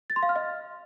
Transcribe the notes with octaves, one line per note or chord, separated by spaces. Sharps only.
A6
C6
F5
F6
D#5